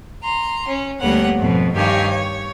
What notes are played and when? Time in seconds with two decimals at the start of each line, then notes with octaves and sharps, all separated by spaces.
0.23 A#5 C6
0.67 C#4
1.00 D2 G3 A#3 B3 C#5 F#5
1.38 F2 G#2 B2
1.74 G2 D#3 G4 C#5 F5 G#5
2.09 C#5